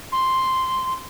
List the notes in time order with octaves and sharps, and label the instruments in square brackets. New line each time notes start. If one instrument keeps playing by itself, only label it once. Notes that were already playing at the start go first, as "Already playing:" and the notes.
[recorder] C6